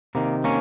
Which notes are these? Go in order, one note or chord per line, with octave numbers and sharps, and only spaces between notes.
C3 D#3 A#3
A#3 C#4